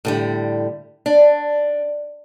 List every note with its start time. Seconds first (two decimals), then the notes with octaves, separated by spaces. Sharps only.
0.05 A2 D3 G3
1.06 D4